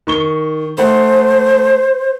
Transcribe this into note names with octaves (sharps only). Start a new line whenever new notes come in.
D#3 C#6 G7
A3 C5 F#5